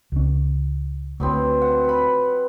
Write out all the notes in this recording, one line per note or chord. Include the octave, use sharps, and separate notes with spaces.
C#2 C#4
D2 F#3 B3 C4
F#5
B4 B5